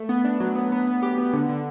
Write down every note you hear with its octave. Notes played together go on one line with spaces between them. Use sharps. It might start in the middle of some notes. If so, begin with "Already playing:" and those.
Already playing: A3
B3
D4
F#3
B3
B3
B3
G4
B3
D3
D3